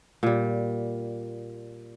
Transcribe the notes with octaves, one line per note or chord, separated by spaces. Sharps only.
A#2 G3